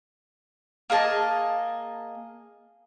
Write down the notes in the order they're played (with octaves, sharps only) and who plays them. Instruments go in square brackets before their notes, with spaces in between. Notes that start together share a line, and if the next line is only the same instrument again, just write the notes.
[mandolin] A#3 G#4 D#5 A5